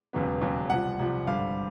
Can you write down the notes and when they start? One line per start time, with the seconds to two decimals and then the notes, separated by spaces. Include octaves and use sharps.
0.13 E1 D#2 C#3 F#3 B3
0.41 E1 D#2 C#3 F#3 B3
0.69 C2 C3 F3 F#5
0.99 C2 C3 F3
1.27 G#1 G2 D3 G3 F5